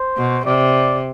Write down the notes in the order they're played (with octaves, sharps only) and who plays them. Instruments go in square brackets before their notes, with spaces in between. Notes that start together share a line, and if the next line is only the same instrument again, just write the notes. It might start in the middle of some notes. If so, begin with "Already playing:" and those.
Already playing: [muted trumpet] C5
[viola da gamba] B2
[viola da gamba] C3 [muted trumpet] D5